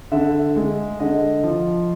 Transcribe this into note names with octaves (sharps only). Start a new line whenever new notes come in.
D3 E5
G#3
D3 D#5
F3